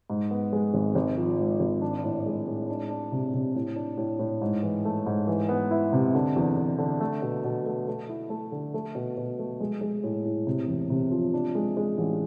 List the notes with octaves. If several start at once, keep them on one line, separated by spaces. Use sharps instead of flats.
G#2
B3
G#3
G#1
G#1
F3
G#2
G#1
D4
A2
G#3
A2
D4
D4
C3
C3
A2
D4
A2
A2
G#2
E3
A3
G#2
E3
B3
E4
C3
D3
E2
D3
D3
A3
B2
B2
A3
A3
E4
A3
D3
A3
B2
B2
A3
G#3
G#3
A2
A2
C3
E1
C3
F3
D4
G#3
G#3
A1